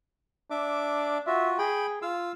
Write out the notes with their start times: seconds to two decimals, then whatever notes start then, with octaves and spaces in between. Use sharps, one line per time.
0.51 D4 E5 D6
1.27 F4 F#4 E5
1.59 G#4 G5 B5
2.02 F4 F5 E6